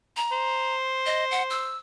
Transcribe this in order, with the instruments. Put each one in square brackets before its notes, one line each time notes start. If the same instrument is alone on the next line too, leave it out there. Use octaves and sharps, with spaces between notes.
[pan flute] A#5
[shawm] C5
[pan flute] D#5
F#5
E6